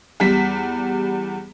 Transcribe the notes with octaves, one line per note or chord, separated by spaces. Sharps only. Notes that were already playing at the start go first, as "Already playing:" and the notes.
E2 G3 B6